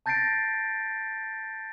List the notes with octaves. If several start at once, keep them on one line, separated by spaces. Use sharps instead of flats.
A5 G6 A6 A#6 C7 D7